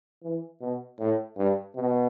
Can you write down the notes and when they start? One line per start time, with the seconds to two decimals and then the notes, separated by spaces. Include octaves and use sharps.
0.23 E3
0.61 B2
0.99 A2
1.37 G2
1.76 B2